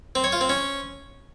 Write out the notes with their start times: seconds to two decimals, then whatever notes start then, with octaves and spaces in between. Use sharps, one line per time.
0.15 C4
0.24 C#5
0.32 F4
0.41 C4
0.49 C#4